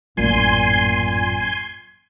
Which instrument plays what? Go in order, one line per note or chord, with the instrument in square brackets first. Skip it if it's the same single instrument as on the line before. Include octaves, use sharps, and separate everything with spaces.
[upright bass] A1 F#2 [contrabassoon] A#2 [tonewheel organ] G#5 C6